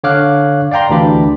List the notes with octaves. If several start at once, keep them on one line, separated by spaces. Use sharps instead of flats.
D3 C#5 F5 D6 F6 F#6
D5 F5 G5 A#5 C6
D2 E3 D4 G4 B5 D6